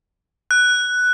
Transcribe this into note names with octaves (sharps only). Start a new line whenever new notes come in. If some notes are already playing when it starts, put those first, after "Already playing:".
F#6